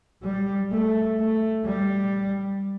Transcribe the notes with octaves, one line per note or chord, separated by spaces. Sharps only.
G3
A3
A3
G3